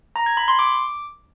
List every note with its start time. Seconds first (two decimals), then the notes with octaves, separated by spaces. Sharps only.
0.16 A#5
0.26 G#6
0.37 B5
0.48 C6
0.59 D6